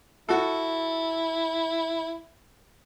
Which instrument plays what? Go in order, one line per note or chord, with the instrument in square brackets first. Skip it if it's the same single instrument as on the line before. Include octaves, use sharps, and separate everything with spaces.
[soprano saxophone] E4 [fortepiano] F#4 A4